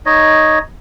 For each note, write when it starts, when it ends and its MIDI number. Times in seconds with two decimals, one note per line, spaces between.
0.06 0.59 63
0.06 0.59 73
0.06 0.59 75